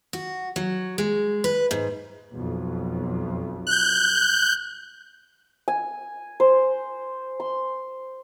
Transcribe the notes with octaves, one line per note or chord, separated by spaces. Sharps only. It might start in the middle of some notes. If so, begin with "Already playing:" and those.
F#4
F#3
G#3
B4
G#2
B1 F2
F#6 G6
G#5
C5
C6